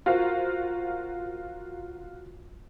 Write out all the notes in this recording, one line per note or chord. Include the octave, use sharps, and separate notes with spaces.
F4 F#4 A#4 C5 F5